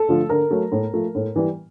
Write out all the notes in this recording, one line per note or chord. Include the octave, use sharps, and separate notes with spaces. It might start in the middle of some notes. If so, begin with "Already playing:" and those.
Already playing: A4
D3 F3 A3
D3 A#4
F#3 A3
A2
F3 A3
A2
E3 G3